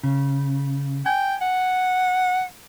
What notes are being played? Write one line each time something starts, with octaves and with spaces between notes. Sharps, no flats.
C#3
G5 G#5
F#5